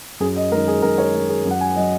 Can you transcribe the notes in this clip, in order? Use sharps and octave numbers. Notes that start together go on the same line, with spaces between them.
F#2 G#4
D#5
D#3 G#3 A#4
G#4
F#2 A#4
C#5
D#3 G#3
G#4
F#2
F#5
G#5
F#3 D#5